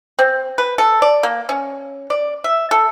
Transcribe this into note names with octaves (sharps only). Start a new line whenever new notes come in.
C4
B4
A4
D5
A#3
C#4
D5
E5
A4